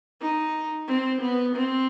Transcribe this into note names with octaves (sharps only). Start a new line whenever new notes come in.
D#4
C4
B3
C4